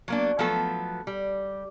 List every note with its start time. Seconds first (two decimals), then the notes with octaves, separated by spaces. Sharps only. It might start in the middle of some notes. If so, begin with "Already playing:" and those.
0.08 F#3 A#3 D4
0.39 F3 F#3 A3 B3 A4
1.07 G3